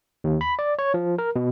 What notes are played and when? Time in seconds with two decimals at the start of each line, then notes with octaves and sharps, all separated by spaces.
0.24 D#2
0.41 B5
0.59 D5
0.79 C#5
0.94 F3
1.19 A#4
1.36 B2